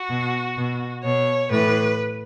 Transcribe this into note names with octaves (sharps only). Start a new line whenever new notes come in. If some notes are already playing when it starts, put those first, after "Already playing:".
Already playing: F#4
B2
B2
B2 C#5
A2 E3 B4